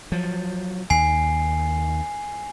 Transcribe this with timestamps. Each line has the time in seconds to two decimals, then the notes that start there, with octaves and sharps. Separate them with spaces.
0.12 F3 F#3
0.90 D#2 G#5 C7